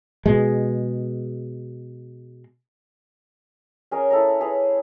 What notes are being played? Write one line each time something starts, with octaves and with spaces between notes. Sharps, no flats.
B2 G#3
C#4 G#4 A#4 D#5
E4 A4 D#5 A#5
G#4 B4 C#5